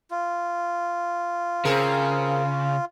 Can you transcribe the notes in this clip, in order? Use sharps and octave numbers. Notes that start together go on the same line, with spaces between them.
F4
C#3 C4 G#4 A#4